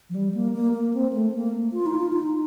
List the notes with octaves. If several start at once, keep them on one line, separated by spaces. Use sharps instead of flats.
F3
G3
A#3
A#3
A#3
C4
A3
A#3
F4
D#4
F4
D#4